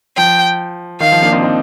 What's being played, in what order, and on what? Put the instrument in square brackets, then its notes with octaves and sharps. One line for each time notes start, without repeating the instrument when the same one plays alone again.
[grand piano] F3 [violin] G5
[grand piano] D#3 [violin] F5
[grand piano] F3
A#3 D4
C4 D#4
C4 D#4